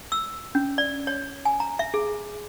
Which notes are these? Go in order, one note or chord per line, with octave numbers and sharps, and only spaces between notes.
E6
C#4
D5
C#5
G#5
A#5
E5
G#4